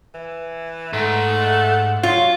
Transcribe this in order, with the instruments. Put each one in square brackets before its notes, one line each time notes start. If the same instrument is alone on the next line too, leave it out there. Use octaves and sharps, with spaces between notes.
[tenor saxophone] E3
[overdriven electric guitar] G#2 [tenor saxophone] A3 [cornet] F#5
[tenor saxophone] F#3 [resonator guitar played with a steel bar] F4